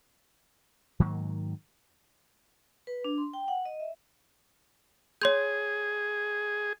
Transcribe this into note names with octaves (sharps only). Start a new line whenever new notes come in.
G#2 D#3 F#3 A#3
B4
D4
C6
G5
F#5
D#5
E5
G#4 C#5 C6 G6